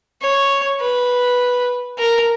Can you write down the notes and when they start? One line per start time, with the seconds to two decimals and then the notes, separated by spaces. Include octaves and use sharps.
0.22 C#5
0.80 B4
1.98 A#4